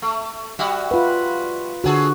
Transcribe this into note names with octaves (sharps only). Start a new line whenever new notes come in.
A3
G3 F#4 E5
F4 B4
D3 F#3 F#4 G#4 A4